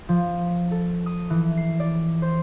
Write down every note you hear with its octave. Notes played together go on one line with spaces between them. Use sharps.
F3
A4
D#6
E3
C7
D5
C5